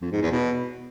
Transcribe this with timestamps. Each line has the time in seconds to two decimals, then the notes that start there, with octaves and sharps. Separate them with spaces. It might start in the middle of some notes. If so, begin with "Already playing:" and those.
0.02 F2
0.12 G#2
0.22 E2
0.31 B2